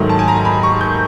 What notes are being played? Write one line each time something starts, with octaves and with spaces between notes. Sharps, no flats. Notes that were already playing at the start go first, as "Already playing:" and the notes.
Already playing: G#2 D#3 F#3 A3
A5
G#5
A#5
B5
C#6
G6